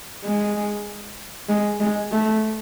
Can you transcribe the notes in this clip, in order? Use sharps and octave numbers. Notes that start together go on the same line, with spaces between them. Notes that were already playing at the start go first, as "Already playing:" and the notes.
G#3
G#3
G#3
A3